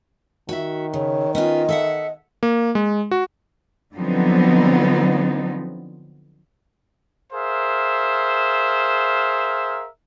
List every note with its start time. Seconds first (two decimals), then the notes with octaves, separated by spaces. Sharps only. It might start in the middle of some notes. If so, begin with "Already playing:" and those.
0.49 D#3 F#4 E5
0.93 C#3 C#5
1.35 B3 C#4 F4 D#5
1.69 A4 E5 F#5
2.43 A#3
2.75 G#3
3.11 F#4
3.95 D3 F3 F#3 B3 C4 D#4
7.33 G#4 A#4 C5 E5 F5